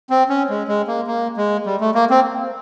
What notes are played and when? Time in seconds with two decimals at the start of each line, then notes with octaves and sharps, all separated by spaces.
0.10 C4
0.29 C#4
0.49 G#3
0.68 G#3
0.87 A#3
1.07 A#3
1.37 G#3
1.66 G3
1.80 A3
1.95 A#3
2.10 C4